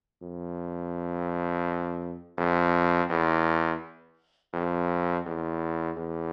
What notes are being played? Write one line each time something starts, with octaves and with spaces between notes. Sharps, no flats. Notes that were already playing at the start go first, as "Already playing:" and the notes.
F2
F2
E2
F2
E2
E2